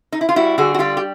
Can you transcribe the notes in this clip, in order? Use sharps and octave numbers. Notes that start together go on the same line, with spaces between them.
D#4
E4
F4
G3 E4 F#4
D3 F#4 G#4
F#4
G3 F4 G4
G4